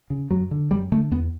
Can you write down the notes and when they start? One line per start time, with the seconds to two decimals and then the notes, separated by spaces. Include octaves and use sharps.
0.10 C#3
0.31 F#2 F#3
0.51 D3
0.71 F#2 G3
0.92 D3 A3
1.11 E2 B3